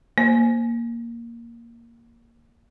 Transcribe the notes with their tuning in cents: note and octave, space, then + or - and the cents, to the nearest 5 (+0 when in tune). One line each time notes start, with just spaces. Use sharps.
A#3 +0 C5 +0